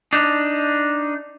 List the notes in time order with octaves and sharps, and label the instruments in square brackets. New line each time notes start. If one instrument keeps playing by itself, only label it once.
[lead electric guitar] D4 D#4